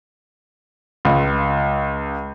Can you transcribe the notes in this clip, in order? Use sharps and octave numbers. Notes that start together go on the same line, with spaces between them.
C#2